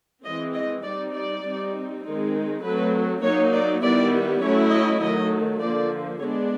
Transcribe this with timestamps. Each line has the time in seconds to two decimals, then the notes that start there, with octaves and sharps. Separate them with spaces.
0.25 E3 G#3 C4 D#5
0.54 D#5
0.84 G3 C4 D#4 D5
1.14 D5
1.44 G3 C4 D#4
2.03 D#3 G#3 C4 D#4
2.63 F#3 A3 C4 B4
3.22 F#3 A#3 D#4 C#5
3.52 D5
3.82 D#3 G3 B3 E4 D5
4.42 F#3 A3 C#4 E4 C#5
4.72 D#5
5.01 D#3 F#3 A3 D#5
5.61 D3 F3 A#3 D5
6.20 G#3 B3 D4 C#5